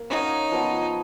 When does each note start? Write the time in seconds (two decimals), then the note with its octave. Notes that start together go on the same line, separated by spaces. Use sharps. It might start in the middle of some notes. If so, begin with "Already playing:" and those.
Already playing: A#3
0.10 C#4 D#4 F#4 C#5 F5
0.51 F3 B3 F#4